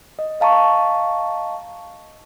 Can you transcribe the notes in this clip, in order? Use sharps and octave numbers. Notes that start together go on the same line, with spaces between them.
D#5
D#5 F5 A5 A#5 C#6